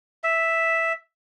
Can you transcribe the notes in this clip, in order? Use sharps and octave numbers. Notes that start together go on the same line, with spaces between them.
E5